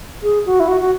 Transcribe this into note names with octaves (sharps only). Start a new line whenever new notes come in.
G#4
F#4
E4
F#4
F#4